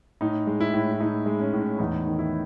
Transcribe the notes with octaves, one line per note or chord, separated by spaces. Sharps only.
A2 D#4
G#3
E4
A2
E4
A2 D#4
G#3
C#4
A2
E2 D#4
D#3
E4